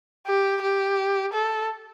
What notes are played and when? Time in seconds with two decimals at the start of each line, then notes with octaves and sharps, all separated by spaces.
0.27 G4
0.62 G4
1.33 A4